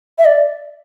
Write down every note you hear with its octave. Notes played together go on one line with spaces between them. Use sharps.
E5
D5